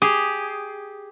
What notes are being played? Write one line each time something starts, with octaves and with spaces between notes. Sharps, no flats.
G4 G#4